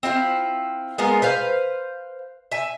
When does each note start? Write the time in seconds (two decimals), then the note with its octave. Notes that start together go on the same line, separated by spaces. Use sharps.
0.03 C4 E4 F4 F5
0.98 G#3 B3 F4 A#4
1.22 B4 C5 F5
2.51 E5 G#5